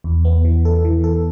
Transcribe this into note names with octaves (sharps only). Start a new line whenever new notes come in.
E2
B3
E3
A4
E3
A4